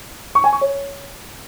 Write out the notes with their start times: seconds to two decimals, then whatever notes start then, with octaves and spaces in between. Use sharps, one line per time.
0.35 C#6
0.44 G#5
0.53 C#6
0.61 C#5